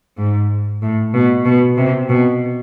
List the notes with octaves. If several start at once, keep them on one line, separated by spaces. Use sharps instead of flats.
G#2
A2
B2
B2
C3
B2